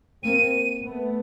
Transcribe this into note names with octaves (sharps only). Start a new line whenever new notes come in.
A#3 C4 D#7
A3 B3